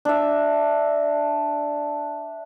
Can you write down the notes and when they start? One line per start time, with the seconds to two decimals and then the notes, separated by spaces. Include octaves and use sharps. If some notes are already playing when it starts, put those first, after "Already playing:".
0.05 D4 E5